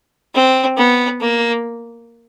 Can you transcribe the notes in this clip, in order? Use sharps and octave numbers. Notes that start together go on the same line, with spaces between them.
C4
B3
A#3